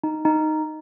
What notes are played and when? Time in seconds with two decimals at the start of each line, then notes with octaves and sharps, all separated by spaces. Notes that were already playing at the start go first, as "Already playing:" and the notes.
0.04 D#4
0.25 D#4